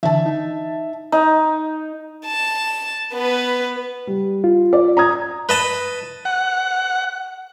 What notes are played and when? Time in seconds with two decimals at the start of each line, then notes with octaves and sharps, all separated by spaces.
0.03 D3 E3 E5 A5
0.26 D#4
1.12 D#4
2.26 A5
3.13 B3 B4
4.07 G3
4.44 F4
4.73 D5
4.97 A#5 D#6 G#6
5.49 B4 D#5 A5
6.25 F#5